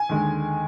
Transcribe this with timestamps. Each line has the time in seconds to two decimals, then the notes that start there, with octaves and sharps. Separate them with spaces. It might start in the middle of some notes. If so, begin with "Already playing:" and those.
Already playing: G#5
0.09 D#2 D3 G#3